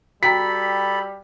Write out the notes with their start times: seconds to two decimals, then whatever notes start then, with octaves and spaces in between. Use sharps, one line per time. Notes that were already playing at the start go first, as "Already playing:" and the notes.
0.23 G3 F#4 A4 G5 A#5 B5 B6